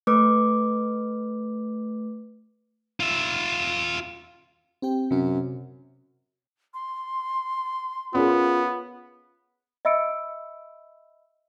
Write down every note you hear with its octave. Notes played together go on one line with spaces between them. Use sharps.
A3 B4 D6
F4 E5
C4 G4 G5
F#2 C3 C#4
C6
B3 C#4 F4 G#4 A#4
D#5 E5 B5 E6 C#7 D7